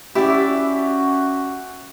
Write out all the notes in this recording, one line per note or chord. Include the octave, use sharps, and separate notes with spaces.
C#4 E4 F#4 G4 D5 E5